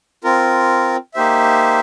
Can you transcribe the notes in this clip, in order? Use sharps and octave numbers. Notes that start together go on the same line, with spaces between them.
C4 F4 A#4
A#3 D#4 G4 C5 E5